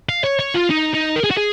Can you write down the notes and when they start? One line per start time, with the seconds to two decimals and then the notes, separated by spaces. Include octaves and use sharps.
0.09 F5
0.24 C#5
0.39 C#5
0.54 F4
0.70 D#4
0.93 D#4
1.16 A#4
1.24 G#4
1.31 F#4
1.37 G#4